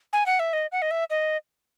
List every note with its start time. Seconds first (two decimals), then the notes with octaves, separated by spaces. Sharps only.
0.13 G#5
0.26 F#5
0.40 E5
0.53 D#5
0.72 F#5
0.82 D#5
0.91 E5
1.10 D#5